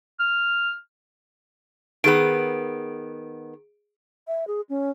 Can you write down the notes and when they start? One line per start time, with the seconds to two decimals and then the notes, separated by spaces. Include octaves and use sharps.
0.20 F6
2.04 D#3 B3 G#4 D7
4.27 E5
4.47 G#4
4.69 C#4